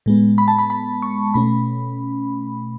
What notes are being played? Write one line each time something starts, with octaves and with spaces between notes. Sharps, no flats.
A2 G#3 B3
B5
A5
B5
B5
C#6
B2 A3 C#4 B5